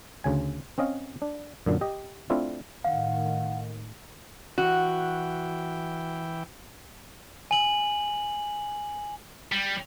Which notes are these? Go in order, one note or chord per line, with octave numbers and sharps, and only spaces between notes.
D2 C#3 G#5
C4 C#4 D#5 F5
D4
F#2 A#2 D3
G4 D#5
A3 C4 D4 E4 F4
A2 D#3 F5 F#5
E3 F#4 G5
G#5 F#7
G3